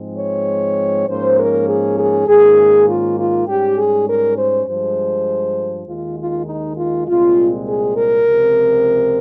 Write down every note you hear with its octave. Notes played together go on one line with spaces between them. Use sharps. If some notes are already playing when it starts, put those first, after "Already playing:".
Already playing: G#2 F3 G#3 C4
C#5
G#2 F3 A#3 C#4 C5
A#4
G#4
G#4
G#2 D#3 A#3 C#4 G#4
F4
F4
G#2 G3 C#4 G4
G#4
A#4
C5
G2 F3 G#3 C5
D#2 D#3 G#3 F4
F4
D#4
F4
C2 A#2 G#3 C4 F4
G#4
A#4
C#2 C3 F3 C4